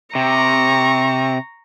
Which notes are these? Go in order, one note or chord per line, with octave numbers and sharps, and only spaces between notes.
C3 A#5 C#6